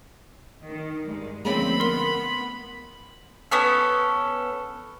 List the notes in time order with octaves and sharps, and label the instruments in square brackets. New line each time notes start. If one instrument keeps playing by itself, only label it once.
[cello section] D#3
G2 G#3
[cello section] D2 F3 C4 [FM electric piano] G#3 A#3 C#4 [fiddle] B5
[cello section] B3 [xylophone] A#4 G7 [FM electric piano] C6 B6
[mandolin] B3 C#4 A4